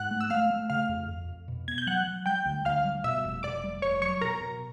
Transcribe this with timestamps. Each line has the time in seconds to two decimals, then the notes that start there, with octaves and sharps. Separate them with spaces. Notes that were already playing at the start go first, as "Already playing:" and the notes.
Already playing: G#2 F#5 F#6
0.11 A3
0.21 E6
0.30 A3 F5 F6
0.50 A3
0.70 C#3 F5 F6
0.89 F2
1.08 F2
1.28 F2
1.48 B2
1.68 B3 G#6
1.78 G6
1.87 F#3 F#5 F#6
2.07 F#3
2.26 G3 G5 G6
2.45 D2
2.65 D2 F5 F6
2.85 G3
3.04 B2 E5 E6
3.24 F1
3.43 F1 D5 D6
3.64 G3
3.82 F1 C#5 C#6
4.02 F#3 C#5 C#6
4.21 B2 A#4 A#5
4.41 B2